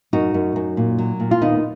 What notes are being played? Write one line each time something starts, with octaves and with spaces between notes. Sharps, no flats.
F#2 D#4 F#4
F#2
F#2
A#2
F#3
A#2
F4
D#2 B3 D#4